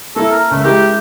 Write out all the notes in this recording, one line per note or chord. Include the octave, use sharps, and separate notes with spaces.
A#3 E4 A4
A#4
C#2 A3
G#3 E4 G4 A#4